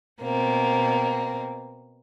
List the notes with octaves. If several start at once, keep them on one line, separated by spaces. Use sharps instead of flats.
B2 A#3 C4